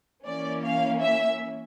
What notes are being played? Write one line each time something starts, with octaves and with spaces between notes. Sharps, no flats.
E3 A#3 C#4 D5
F5
E5